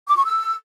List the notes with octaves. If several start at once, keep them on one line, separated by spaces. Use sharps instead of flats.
D6
C#6
E6